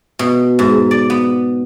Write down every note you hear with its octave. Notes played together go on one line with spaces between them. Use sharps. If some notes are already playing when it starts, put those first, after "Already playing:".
B2
G#2
D5
B3